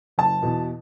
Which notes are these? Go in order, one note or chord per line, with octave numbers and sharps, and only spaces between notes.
F#1 A5
E2 B2